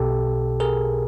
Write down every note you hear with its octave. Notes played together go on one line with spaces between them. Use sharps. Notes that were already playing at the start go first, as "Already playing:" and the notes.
Already playing: B1 B2 G4 A4
G#4 A#4